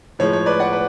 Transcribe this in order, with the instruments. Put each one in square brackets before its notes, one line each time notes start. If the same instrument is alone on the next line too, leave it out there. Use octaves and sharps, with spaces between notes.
[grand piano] A2 F3 G#3 C#5
C#5
B4 D5
D5 F#5
B4